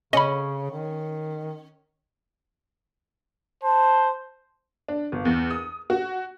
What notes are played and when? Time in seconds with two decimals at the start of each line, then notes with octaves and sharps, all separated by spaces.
0.13 C#3 C#4 D#5 B5
0.71 D#3
3.63 C5 A5
4.88 D4
5.12 G1
5.25 E2
5.51 D#6
5.90 F#4